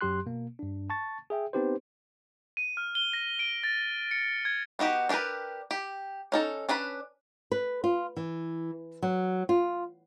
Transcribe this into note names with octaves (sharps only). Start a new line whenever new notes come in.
F#2 F#3 G4 C6 F#6
B2 A#3
G2 D4
A5 C#6 A6
G#4 E5 G5
B3 C4 D#4 G4 B4 C5
D#7
F6
G7
A#6
D7
A6
C#7
G#6
B3 D#4 F#4 G4
D4 F#4 G4 A#4 B4
G4
C#4 D#4 A4
C#4 D4 B4 B5
B4
F4
E3
F#3
F4